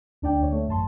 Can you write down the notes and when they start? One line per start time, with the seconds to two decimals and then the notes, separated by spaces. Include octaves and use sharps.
0.22 D2 D4 D5 G5
0.40 D2 C#5
0.52 A3
0.67 A1 F#2 A5 C6